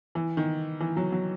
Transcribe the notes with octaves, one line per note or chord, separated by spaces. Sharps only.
E3
D#3
E3
F#3
F#3